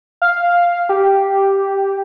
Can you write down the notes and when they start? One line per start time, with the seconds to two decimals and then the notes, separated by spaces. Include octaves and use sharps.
0.22 F5
0.89 G4